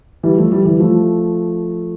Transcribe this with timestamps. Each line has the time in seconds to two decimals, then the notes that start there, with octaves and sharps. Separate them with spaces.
0.23 E3 G3
0.37 F3 A3
0.52 E3 G3
0.65 E3 G3
0.80 F3 A3